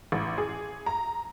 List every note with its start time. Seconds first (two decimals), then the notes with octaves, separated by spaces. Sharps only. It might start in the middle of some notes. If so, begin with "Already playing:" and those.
0.12 A1
0.38 G#4
0.86 A#5